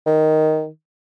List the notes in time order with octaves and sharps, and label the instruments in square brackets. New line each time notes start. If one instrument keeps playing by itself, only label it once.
[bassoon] D#3